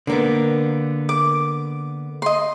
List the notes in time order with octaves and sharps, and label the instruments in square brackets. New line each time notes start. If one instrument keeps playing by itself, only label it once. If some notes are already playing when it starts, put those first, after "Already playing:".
[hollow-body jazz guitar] D3 A#3 B3
[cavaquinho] D6
D#5 C6